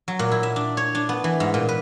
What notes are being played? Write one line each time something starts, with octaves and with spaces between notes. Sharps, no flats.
F#3
A#2
E4
E5
D4
C#5
D4
B3
E3
G#2
A#2
B4